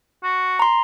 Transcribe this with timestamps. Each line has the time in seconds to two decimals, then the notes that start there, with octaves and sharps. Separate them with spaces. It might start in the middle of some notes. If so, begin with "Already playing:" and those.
0.23 F#4
0.59 A#5 C6